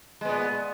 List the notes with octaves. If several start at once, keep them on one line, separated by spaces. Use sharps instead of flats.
A#2 G#3 B3